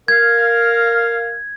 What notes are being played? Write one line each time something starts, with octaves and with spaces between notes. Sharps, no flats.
A#4 F5 G#6